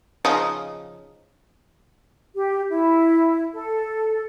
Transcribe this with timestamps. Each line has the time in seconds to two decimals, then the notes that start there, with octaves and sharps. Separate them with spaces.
0.25 C#3 F3 D#4
2.35 G4
2.69 E4
3.54 A4